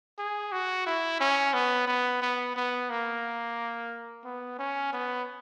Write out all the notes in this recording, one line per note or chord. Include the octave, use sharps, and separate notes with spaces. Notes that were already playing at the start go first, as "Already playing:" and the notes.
G#4
F#4
E4
C#4
B3
B3
B3
B3
A#3
B3
C#4
B3